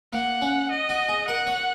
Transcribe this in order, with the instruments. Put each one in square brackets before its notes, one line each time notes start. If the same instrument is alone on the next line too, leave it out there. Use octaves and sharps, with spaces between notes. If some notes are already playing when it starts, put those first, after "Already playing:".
[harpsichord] A#3 [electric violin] F#5
[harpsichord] C#4
[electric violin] D#5
[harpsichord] F#4
G#4
[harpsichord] A#4 [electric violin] F#5
[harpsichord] C#5